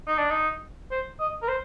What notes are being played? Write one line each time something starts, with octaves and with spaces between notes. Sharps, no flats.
D#4
D4
D#4
C5
D#5
A#4
C5